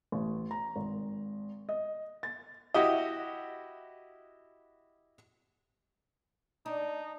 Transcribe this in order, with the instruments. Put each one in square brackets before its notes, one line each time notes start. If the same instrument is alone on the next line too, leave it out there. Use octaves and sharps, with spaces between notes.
[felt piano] A1
A#5
G#1
D#5
A6
[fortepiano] E4 F#4 G4 D#5
[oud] D4 [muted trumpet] D#4